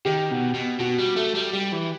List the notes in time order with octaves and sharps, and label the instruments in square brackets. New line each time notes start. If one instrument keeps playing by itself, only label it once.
[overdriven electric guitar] D#3 [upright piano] G4
[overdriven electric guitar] B2
B2
[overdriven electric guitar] B2 [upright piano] F#4
[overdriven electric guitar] G3
A3
G3
[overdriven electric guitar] G3 [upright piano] G4
[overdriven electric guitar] E3